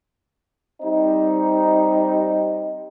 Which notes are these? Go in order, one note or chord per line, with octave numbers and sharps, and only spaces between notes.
G3 C4 D#4